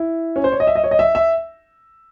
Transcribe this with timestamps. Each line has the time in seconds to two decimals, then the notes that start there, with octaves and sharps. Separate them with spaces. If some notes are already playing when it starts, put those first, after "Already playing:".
Already playing: E4
0.36 C#4
0.44 C5
0.52 C#5
0.60 D#5
0.67 E5
0.76 D#5
0.84 C#5
0.91 D#5
0.99 E5
1.15 E5